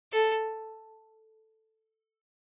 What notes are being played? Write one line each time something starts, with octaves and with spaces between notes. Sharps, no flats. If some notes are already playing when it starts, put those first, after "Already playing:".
A4